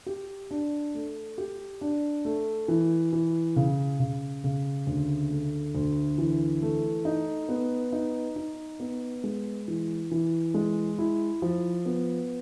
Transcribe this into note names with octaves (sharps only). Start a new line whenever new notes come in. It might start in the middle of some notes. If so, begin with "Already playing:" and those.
G4
D4
A3
G4
D4
A3
E3
E3
C#3
C#3
C#3
D2
A3
D2
E3
A3
D#4
B3
D#4
D#4
B3
G#3
E3
E3
G#3
E4
F3
B3